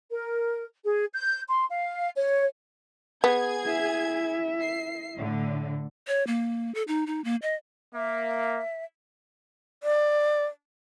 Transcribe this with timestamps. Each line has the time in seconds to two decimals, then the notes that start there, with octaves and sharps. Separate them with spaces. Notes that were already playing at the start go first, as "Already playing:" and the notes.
0.10 A#4
0.84 G#4
1.14 G6
1.47 C6
1.70 F5
2.17 C#5
3.24 B3 G#4 G#6
3.64 E4 E5
4.61 C7
5.18 A2 D3
6.08 C#5
6.27 A#3
6.75 A4
6.88 D#4
7.07 D#4
7.24 A#3
7.42 D#5
7.94 A#3 E5
9.82 D5